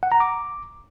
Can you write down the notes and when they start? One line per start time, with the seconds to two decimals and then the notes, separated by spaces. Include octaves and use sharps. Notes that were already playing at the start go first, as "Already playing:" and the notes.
0.03 F#5
0.12 A#5
0.20 D6